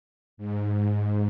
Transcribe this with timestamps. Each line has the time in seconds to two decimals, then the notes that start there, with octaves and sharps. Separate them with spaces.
0.37 G#2
0.74 G#2